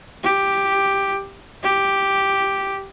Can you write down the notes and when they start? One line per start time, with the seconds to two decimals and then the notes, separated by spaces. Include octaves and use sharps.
0.24 G4
1.63 G4